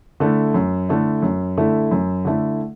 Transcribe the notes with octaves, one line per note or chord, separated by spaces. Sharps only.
D3 A3 E4
F#2
D3 A3 E4
F#2
D3 A3 E4
F#2
D3 A3 E4